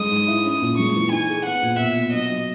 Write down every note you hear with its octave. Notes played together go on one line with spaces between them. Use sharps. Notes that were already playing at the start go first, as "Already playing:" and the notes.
Already playing: G#3 D#6
G#2
E4
C#4
A#2
G#3 C#6
E3
D#4 G#5
G#4
B3 F#5
A#2
B2 E5
B2
F#3 D#5
F#3